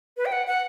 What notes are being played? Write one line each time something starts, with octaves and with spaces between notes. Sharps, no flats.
B4
G5
F#5
F#5